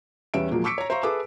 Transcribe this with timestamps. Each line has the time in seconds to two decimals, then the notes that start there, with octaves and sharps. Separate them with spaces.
0.34 E2 G3 C#4 B4 E5 D7
0.51 A#2 F3 F#3 G#3 A#3
0.64 C#6 D6 E6 B6 C#7 D7
0.78 C#5 A#5
0.90 C5 E5 F5 A#5 C6 C#6
1.03 G#4 A4 B4 E5 D6